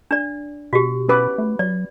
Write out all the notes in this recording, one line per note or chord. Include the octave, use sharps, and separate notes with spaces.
D4 D5
B2 F#4 G4
C#4 B4 D6
A3
F#3 D5